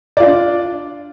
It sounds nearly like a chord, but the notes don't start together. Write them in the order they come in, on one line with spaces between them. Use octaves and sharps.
D5 F4 D4